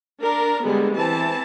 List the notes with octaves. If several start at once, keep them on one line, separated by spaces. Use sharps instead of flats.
D4 A#4
D3 G3 G#3 B3
E3 C4 A5